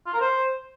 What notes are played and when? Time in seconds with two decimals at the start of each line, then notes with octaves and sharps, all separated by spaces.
0.06 F4
0.13 A#4
0.21 C5